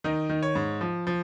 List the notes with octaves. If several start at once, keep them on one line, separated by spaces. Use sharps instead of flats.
D#3 D#4
D#3
C#5
G#2
F3
F3